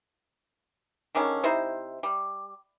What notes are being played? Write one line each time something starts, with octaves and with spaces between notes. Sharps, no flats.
D3 D#3 G#3 C#4
C3 D#4 E4 C5
G3